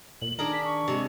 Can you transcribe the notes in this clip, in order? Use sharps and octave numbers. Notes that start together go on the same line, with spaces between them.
A#2 F#7
D#3 D4 G#4 A#4
B6
C#6
C3 G#3 G4